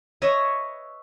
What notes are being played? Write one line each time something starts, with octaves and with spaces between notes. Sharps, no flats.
B4 C#5 D#5 E5